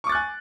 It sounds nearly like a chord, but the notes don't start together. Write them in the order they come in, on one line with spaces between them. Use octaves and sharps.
C#6 D6 A6 F#6 G#5